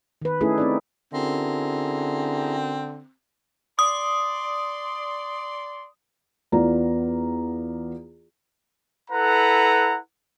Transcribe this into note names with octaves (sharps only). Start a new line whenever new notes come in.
D#3 B4
A3 C#4 D#4 E4 G#4 A4
C4 D#4 D5
D3 C4 C#4 E4 F#4 G#4 A#4 A#5
D5 C6 D#6
E2 B3 F4 D5 A#5
E4 A4 B4 F#5 A#5